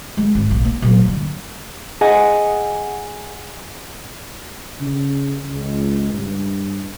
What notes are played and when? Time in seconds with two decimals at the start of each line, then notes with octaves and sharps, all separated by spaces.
0.17 G#3
0.35 G#1
0.51 A#1
0.65 A#3
0.82 A#2 F#3
1.05 G2 D3
2.01 G#4 D#5 F#5 G#5
4.80 C#3
5.51 C#2
6.13 G2